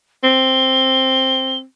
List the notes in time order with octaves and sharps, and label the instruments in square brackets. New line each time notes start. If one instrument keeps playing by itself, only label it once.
[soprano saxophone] C4 [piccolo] G7